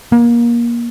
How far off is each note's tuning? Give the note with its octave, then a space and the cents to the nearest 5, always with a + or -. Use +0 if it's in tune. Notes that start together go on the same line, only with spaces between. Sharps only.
A#3 +25